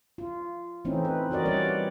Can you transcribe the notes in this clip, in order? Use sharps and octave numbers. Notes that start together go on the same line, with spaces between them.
F4
E3 A3 C4 C#4 D#4 E4
B4
E3 F#4 A#4 D5 D#5
G3 C#4 B4 C#5 D5